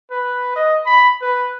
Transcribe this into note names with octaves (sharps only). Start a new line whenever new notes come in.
B4
D#5
B5
B4